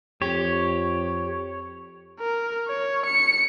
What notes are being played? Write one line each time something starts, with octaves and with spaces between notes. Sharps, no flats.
F2 G4 C#5
A#4
C#5
C#7